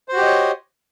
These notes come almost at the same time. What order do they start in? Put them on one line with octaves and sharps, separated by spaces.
C5 F#4 G4 D#5 C#5